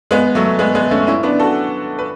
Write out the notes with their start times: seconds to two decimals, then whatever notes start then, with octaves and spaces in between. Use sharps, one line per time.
0.11 G#3 B3
0.35 F#3 A3
0.59 G#3 B3
0.75 G#3 B3
0.91 A3 C#4
1.07 C#4 E4
1.23 B3 D4
1.40 F#4 A4
1.99 B4